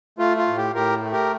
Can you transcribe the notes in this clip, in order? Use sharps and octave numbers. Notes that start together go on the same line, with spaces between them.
A3 F4
F4
A2
G4
A2 G4 A#4
A3
G4 A#4